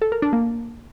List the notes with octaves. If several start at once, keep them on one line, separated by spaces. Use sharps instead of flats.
A4
A#4
D4
A#3